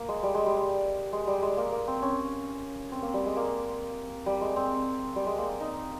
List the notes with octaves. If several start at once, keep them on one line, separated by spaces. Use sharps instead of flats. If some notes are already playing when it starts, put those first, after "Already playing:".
Already playing: A#3
G#3
G3
G#3
G3
G#3
G3
G#3
A#3
A#3
C4
C#4
C4
A#3
G3
G#3
A#3
G3
G#3
C4
G3
G#3
A#3
D#4